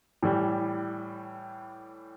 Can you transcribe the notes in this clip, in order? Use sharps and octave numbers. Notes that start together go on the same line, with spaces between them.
A2 E3 G3